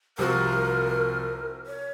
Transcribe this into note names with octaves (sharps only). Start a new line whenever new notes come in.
C2 C3 F3 C4 F#4 A#4
C#5